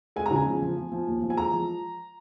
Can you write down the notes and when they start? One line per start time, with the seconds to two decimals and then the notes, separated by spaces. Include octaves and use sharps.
0.16 G#3 G#5
0.26 A#5
0.31 C#3
0.36 G#5
0.46 F3
0.61 F3
0.77 F3
0.92 F3
1.07 D#2
1.22 F3
1.30 G#5
1.37 G#3 A#5
1.53 F3